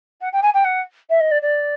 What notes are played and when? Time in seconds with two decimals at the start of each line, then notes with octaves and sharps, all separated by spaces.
0.21 F#5
0.32 G5
0.42 G#5
0.54 G5
0.64 F#5
1.09 E5
1.20 D#5
1.31 D5
1.42 D5